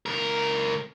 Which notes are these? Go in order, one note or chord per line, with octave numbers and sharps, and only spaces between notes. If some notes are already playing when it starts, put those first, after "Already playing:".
C#2 A#4